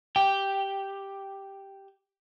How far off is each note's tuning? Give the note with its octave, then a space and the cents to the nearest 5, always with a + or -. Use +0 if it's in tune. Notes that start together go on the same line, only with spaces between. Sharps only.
G4 +0 G5 +0